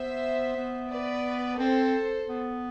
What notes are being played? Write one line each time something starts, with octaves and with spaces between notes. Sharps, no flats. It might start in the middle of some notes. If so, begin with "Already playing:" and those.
Already playing: B3 C5 E5
B3
B4 D5
C4 A4 C5
B3